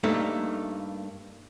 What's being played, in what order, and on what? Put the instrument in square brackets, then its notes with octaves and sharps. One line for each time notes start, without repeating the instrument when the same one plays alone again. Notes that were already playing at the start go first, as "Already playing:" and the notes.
[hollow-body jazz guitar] G2 A3 A#3 D#4